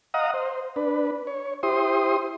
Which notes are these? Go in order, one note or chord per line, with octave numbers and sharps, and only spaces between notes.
D#5 F5 F#5 A#5 D#6
C5
D4 B4
C#5
E4 G4 C5 C6 D#6